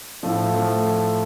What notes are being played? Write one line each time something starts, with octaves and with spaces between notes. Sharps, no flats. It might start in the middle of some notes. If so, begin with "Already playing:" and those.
A2 F3 A3
F3 A3